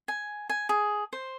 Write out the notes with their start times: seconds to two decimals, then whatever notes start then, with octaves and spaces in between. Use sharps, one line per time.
0.08 G#5
0.49 G#5
0.69 G#4
1.13 C5